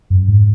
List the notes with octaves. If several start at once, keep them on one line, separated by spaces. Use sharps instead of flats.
F#2
G#2